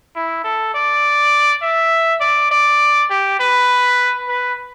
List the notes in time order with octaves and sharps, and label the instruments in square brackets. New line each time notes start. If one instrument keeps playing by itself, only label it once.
[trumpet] E4
A4
D5
E5
D5
D5
G4
B4
B4